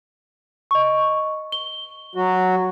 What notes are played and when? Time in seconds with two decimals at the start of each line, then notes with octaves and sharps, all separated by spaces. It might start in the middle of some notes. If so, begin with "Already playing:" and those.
0.71 D#5 C#6
1.52 G7
2.15 F#3 F#4